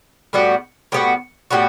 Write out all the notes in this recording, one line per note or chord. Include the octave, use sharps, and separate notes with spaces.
A2 G3 B3 F#4
A2 G3 B3 F#4
A2 G3 B3 F#4